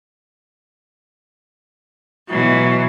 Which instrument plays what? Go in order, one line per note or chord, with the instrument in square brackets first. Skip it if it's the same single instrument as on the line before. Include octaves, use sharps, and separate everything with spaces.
[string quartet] B2 E3 F#3